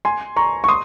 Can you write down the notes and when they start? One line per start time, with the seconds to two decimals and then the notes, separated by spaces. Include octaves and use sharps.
0.05 G#5 C6
0.36 A#5 C#6
0.64 C#6
0.68 C6 D#6